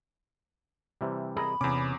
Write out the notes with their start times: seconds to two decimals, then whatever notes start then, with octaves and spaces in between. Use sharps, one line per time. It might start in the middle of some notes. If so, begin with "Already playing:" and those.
1.01 C3 E3 G3
1.36 G#4 A#4 D#5 B5
1.61 E2 C3 C#4 D6